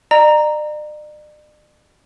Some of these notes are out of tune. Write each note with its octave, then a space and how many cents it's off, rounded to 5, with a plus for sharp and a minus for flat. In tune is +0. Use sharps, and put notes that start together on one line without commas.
D5 +45 A#5 +0